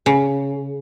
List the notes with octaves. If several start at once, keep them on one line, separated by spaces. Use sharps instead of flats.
C#3